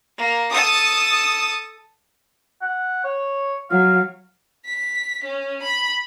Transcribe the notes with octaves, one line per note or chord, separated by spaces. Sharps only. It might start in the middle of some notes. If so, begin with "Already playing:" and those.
A#3
A4 A5 D#6
F#5
C#5
F#3 F5
B6
C#4
B5